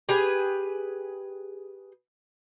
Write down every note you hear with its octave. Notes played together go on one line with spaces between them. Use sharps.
G4 G#4 B4 G#5